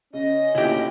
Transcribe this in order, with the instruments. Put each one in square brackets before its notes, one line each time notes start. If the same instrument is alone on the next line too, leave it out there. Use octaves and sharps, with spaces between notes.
[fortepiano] C#3 [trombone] C#4 [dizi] D#5
[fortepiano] D2 A#2 [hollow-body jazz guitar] E4 G4